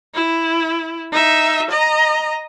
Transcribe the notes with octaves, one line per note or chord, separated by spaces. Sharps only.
E4
D#4 E5
D#5 A#5